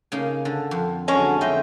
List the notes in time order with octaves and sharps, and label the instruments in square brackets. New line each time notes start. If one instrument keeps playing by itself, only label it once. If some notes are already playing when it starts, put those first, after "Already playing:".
[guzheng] C#3 A#3 D#4
D3
F2
[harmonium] D3 F#3 A5 [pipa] G#3 C#4
[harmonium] D3 E5 G5 [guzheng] D#4 C5 D#5